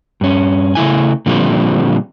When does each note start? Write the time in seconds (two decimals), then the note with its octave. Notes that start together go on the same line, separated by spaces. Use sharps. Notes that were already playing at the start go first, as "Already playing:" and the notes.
0.21 G2 C#4
0.75 C#3 A3 E4 G#5
1.26 A#2 D3 F3 G3 A#3 C4